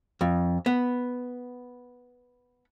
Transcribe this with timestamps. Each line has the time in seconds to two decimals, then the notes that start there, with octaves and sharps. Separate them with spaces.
0.21 F2
0.66 B3